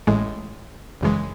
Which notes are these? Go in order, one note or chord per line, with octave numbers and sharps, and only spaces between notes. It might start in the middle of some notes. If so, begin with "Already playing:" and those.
A1 A2 G#3
G#1 F#2 C#3 E3 G#3